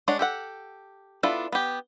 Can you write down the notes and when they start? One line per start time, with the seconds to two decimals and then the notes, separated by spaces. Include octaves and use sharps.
0.08 G#3 D4 C#5 F#5
0.19 G4 A4 F#5
1.23 B3 D4 E4 F4 A4
1.52 B3 G4